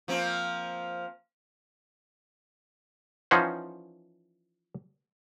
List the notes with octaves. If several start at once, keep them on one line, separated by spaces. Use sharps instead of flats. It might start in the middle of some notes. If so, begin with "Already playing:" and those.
F3 A#3 C4
E3 F3 C#4 D#4 C5 F#5